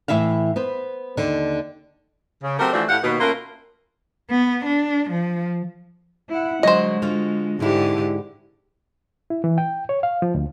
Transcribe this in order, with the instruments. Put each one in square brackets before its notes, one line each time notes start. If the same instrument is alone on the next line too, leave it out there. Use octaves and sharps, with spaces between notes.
[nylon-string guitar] A2 E3 G#3 E4 E5 F5
B3 B4 C5
D#2 D3 D4
[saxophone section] C#3
F#3 A3 C4 G4 A#4
E3 F3 A3 D4 F#4
A2 G4 F5 F#5
D#2 B2
A3 A#3 C#4 F4 A#4 B4
[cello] B3
D4
F3
E4 F#5
[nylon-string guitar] D3 F#3 [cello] G#3 [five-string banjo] C5 D#5
[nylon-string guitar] D3 F4 F#4
[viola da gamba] G#2 G4 [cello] D3 [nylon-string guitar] G#3 E4
[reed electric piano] E4
E3
G5
C#5
F5
F3
D2